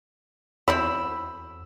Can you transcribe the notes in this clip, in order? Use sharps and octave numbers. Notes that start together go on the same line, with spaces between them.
E2 C4 E4 B5 E6